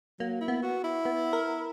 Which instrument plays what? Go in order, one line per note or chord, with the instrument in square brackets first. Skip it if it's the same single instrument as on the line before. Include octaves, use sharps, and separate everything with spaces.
[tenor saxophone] F#3 [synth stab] A#3
[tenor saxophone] E4
[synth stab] B3
[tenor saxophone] F#4
E4
[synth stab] B3
A#4